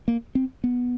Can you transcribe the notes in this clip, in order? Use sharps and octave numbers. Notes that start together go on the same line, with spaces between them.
A#3
C4
B3